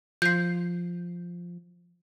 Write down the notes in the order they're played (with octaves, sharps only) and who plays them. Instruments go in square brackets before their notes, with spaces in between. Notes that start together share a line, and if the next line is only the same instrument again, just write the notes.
[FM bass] F3 [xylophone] G6 C7